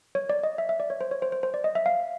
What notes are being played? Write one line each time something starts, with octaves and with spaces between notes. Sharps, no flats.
C#5
D5
D#5
E5
E5
D5
C#5
C5
C#5
C5
C5
C5
D5
D#5
E5
F5